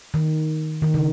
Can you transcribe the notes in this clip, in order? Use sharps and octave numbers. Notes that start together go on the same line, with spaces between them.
D#3
D#3
C#3